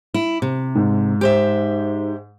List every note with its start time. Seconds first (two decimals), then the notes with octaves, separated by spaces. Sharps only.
0.14 E4
0.42 C3
0.75 G#2
1.21 G4 C5 E5